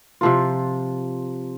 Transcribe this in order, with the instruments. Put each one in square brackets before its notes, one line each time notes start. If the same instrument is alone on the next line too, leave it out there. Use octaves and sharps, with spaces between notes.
[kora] C3 F3 F4